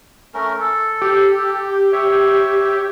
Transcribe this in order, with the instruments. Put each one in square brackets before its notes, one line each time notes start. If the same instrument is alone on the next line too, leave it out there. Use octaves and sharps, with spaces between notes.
[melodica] A3 C#4 A#4
A4
[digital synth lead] G4
[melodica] C#5 E5